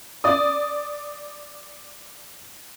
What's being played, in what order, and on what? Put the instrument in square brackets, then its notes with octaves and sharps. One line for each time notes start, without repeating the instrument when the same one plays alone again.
[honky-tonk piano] D5 D#6